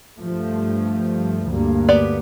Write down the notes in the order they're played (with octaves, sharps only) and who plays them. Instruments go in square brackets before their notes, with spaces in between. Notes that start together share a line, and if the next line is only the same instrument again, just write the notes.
[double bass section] G2 F3 A3
D2 G2 A#3
[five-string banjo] B3 G4 D5